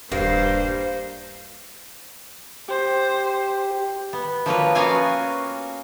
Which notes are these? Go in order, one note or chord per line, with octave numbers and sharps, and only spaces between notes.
D#1 G2 A#3 C5
G4 C5
B3
F3 F#3 A#3 B4
A#3 B3 C#4 F#4 F5 G#5